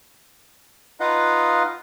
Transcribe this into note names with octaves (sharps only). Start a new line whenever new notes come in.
D#4 F4 B4 D#5 F5 F#5